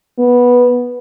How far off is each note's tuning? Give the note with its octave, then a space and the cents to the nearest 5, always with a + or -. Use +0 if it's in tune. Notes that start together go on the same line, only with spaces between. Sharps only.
B3 -10